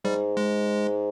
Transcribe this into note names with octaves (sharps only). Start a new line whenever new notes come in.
G#2 G3
G#3